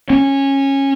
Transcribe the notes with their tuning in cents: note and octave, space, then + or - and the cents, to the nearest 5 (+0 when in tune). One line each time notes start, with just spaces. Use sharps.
C#4 -15